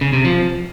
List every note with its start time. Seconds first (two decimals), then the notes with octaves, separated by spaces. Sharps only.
0.01 C#3
0.13 C3
0.25 F3